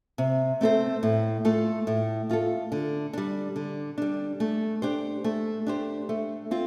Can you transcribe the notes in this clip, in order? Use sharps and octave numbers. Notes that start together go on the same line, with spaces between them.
C3
A3 C4 A4 C5
A2
A3 F4 A4
A2
A3 F4 A4
D3
G3 D4
D3
G3 D4
A3
D4 G4 C5
A3
D4 G4 C5
A3
C4 F4